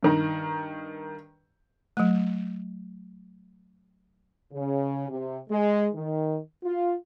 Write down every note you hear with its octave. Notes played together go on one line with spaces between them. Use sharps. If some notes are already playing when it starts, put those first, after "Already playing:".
G2 D#3 A#5
F#3 A3
C#3
C3
G#3
D#3
F4